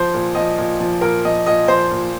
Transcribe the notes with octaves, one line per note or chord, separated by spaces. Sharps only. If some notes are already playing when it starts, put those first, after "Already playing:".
Already playing: F3 C5
A#2
F3 D#5
A#2
F3
A#2 A#4
F3 D#5
A#2 D#5
F3 C5
A#2